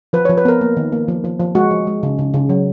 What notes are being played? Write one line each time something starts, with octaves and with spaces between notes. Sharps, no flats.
F3 B4
C#5
F3
B4
B3 A#4
A#3
D#3
A#3
F3
F3
F3
G#3 F#4
F3
G#3
C#3
C#3
C#3
F#3